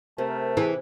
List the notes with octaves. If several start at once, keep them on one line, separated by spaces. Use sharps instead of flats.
C3 A3 A#4
E3 G#4